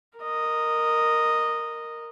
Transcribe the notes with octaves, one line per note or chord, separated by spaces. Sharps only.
A#4 D#5